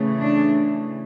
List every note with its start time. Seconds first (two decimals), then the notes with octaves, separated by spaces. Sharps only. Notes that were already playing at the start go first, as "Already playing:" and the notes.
Already playing: C#3 E3 A3
0.22 D4